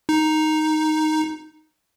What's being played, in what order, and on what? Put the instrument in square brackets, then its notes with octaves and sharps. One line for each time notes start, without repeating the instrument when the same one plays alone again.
[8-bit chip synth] D#4